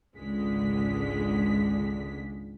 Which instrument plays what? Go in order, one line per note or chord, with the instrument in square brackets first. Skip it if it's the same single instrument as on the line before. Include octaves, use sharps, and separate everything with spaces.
[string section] G#1 C#2 D3 G#3 B6